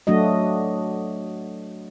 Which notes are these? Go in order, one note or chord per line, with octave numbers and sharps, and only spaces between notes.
F#3 A3 D4 F#4 D#5